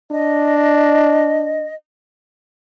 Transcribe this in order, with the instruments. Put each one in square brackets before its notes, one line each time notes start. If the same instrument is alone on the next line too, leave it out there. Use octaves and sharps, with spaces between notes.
[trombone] D4 [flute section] D#5